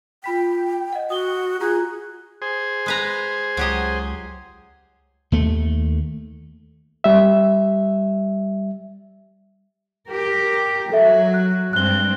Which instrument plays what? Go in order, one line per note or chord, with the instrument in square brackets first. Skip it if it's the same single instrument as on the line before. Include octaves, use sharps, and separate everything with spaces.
[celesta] F4 B5 B6 [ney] G5
[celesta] D#5 F#5
[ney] F#4 [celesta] D#6 G7
[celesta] F4 A#5 F#6 [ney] G#4
[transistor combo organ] G#4 C5
[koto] G#3 B4 A#5
[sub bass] C#2 [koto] F#3 G4 D#5
[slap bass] D#2 A3
[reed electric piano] G3 E5
[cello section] G4 A#4
[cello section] F#3 F#4 [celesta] A4 E5
[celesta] F#6
[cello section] G2 G#3 C4 [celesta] F#6 G7